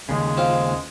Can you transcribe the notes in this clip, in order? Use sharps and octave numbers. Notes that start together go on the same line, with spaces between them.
D#2 C#3 G#3
C4 F4